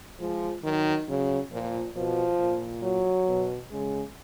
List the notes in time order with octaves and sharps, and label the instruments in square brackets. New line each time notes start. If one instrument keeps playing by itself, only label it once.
[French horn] F3 [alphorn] G#3
[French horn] D#3 [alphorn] F#3
[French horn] C#3 [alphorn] F#3
[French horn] A#2 [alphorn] F3
[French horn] B2 [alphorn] F3
[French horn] A#2
[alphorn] F#3
[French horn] B2
[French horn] C#3 [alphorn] G#3